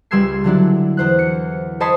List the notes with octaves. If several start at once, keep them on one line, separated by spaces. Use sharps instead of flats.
C#2 G3 C6 E6 G#6 C7
D3 F#3 D4 E4
E2 C5 F#6
C#7
C5 C#5 D#5 A5 B5 C6